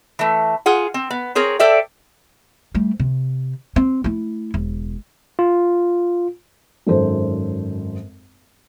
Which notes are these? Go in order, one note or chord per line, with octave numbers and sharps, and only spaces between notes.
E3 A3
F4 G#4 F#5
C4
B3
C4 G#4 A#4 C#5
A4 C5 D5 E5 G5
G3 A3
C3
C4
A3 E4
E1
F4
G#1 F#2 A4 C5